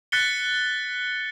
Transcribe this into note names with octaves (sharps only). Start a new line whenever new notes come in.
F#6 A6 B6 C#7 G7